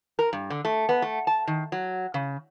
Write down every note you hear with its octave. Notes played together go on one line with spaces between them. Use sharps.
A#4
G2
D3
A3
B3
A3
A5
D#3
F#3
C#3